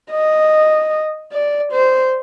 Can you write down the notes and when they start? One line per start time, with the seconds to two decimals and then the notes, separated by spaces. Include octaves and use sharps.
0.11 D#5
1.32 D5
1.72 C5